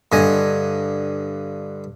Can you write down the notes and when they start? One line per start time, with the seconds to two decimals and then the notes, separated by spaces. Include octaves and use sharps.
0.12 G2 D3 D#5 G#5